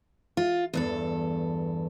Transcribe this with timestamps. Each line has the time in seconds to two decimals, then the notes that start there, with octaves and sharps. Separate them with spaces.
0.37 F4
0.73 E2 G2 A4